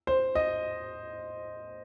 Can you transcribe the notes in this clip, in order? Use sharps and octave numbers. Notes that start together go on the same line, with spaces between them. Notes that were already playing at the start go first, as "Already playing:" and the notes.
C5
D#5